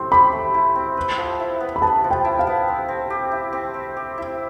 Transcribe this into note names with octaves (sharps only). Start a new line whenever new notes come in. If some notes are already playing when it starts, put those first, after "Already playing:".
Already playing: A3 C4 E4 C6
G4 B5
A3
E4
C4
B4
F3
E4
B3
B5
B4 A5
F3
G5
E4
F5
B3
C4
C4
G4
E4
C4
C4
G4
E4